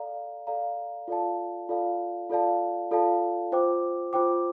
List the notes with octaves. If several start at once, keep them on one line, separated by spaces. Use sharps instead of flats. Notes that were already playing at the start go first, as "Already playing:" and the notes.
Already playing: A4 D5 F5 A#5
A4 D5 F5 A#5
F4 A4 D5 F5 A5
F4 A4 D5 F5 A5
F4 A4 D5 F5 A5
F4 A4 D5 F5 A5
F4 C5 G5 D6
F4 C5 G5 D6